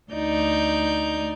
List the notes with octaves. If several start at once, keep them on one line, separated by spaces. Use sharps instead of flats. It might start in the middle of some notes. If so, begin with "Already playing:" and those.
D2 D#4 D5 G6